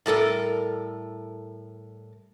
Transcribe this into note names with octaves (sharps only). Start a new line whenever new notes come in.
A2 G3 A4 A#4